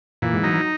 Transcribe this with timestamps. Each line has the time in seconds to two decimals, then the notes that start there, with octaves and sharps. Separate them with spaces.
0.22 A#2 E3 A#3
0.33 G#2 G#3
0.43 F#3 D#4
0.54 F#3